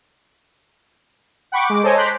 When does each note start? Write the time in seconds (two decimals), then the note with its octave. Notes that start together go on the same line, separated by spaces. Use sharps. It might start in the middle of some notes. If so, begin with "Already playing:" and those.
1.52 F#5 G5 B5 C#6 D6
1.68 G#3 D6
1.83 A4 C5 C#5 D#5 G#5
1.96 A#5 C6 D6 F#6 G6 B6